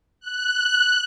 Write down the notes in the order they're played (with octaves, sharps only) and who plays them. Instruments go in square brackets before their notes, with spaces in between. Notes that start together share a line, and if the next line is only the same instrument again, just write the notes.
[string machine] F#6